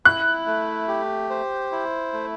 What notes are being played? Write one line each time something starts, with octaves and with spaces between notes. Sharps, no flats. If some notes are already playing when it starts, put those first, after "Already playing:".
E4 F#6
A3
G4
C5
E4
A3